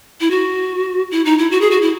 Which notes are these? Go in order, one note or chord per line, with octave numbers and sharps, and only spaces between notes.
E4
F#4
E4
D#4
E4
F#4
G#4
F#4
E4